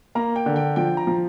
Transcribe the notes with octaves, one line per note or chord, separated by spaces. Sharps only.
A#3 A#5
G5
D3
G5
F3 G5
A#5
F3